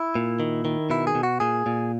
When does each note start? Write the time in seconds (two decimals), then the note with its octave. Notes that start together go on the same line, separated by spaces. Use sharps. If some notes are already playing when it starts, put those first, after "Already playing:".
Already playing: E4
0.15 A#2
0.40 D#3
0.65 D#3
0.90 B2 E4
1.07 G#4
1.15 B2
1.23 F#4
1.40 A#2 G#4
1.66 A#2